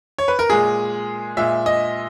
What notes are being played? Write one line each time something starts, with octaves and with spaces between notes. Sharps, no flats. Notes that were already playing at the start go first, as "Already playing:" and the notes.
C#5
B4
A#4
A#2 G#3 G#4
A#2 G#3 E5
D#5